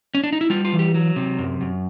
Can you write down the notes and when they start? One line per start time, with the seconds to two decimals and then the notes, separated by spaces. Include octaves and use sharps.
0.15 C#4
0.24 D4
0.33 D#4
0.41 E4
0.50 G3 F4
0.65 F4
0.73 E3
0.79 G4
0.94 F#3
1.16 C3
1.38 F#2
1.61 F#2